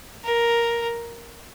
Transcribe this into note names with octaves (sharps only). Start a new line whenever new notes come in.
A#4